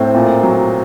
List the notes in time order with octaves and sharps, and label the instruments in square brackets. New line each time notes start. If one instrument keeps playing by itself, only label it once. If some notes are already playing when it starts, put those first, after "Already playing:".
Already playing: [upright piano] A2 C4
A#2
F#3